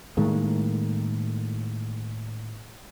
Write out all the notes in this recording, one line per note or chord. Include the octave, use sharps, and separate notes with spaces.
A2 D#3 G#3 A#3